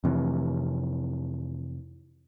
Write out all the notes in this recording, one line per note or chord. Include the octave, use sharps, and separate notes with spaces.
F2 C3 E3